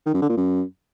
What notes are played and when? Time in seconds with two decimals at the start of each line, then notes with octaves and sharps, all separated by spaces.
0.06 D#3
0.14 F#2
0.22 D3
0.30 A#2
0.37 F#2